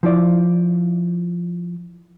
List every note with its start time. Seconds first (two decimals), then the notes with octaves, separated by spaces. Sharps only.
0.03 F3 E4 D5